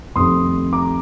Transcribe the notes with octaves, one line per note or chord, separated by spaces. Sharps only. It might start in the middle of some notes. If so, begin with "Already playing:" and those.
F2 C3 D#3 A3 C4 C6 D#6
A#5 D6